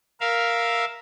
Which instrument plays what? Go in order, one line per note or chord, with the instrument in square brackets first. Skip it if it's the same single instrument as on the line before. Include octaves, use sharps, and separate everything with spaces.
[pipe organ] A#4 E5 F5